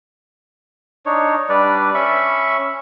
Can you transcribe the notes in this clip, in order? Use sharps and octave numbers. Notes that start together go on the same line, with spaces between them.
D4 D#4 C#5
G3 D4 B4 D5
C#4 E5 B5 C#6